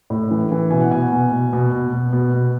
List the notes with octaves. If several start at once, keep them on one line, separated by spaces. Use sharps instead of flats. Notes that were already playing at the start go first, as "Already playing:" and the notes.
A2
E3
E3
B2 G#5
F#5
B2 G#5
B2
B2
B2
B2
B2
B2
B2